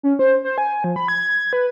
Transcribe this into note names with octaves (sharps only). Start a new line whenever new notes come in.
C#4
C5
C5
G#5
F3
B5
G#6
B4